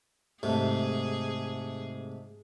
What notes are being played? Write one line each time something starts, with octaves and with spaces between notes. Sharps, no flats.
G#2 C3 A3 G#4